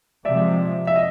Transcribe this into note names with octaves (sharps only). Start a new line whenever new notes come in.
C3 F3 G#3 D5 E5
E5
D#5